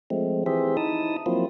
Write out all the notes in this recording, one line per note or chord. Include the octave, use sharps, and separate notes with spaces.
F3 G#3 A3 C4
E3 C4 G4 G#4 C5 E5
D#4 E4 A5 D#6
F3 F#3 A#3 C4 E4 F4